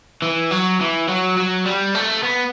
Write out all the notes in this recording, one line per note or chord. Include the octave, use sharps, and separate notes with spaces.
E3
F#3
E3
F#3
F#3
G3
A3
B3